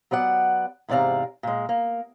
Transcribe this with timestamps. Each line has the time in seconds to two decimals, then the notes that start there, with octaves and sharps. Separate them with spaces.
0.11 F#3 B3 D5 F#5
0.89 E2 G#2 C3 D5 F5 A#5
1.43 A#2 G#3
1.69 A#3